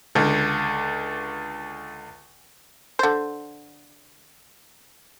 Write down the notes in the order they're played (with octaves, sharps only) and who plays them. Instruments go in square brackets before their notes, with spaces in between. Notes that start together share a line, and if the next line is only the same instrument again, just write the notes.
[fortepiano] C#2 D3
[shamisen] D3 C5